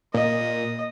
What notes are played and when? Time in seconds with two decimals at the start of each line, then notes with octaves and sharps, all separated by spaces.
0.14 A#2 D#5